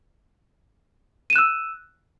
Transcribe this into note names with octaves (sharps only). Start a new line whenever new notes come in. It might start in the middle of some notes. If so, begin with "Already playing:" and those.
E6 F#6 D#7 E7